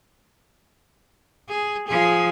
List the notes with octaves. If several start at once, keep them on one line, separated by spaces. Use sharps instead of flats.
G#4
F3 G#4